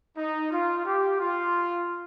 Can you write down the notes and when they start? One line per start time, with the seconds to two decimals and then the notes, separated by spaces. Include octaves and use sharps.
0.17 D#4
0.51 F4
0.84 G4
1.19 F4